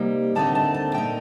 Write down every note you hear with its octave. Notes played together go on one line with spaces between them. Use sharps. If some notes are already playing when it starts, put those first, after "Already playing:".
Already playing: C3 G3 A#3 D#4
D#2 D3 A3 C4 D#4 A5
A5
A5
A#2 A3 D#4 G5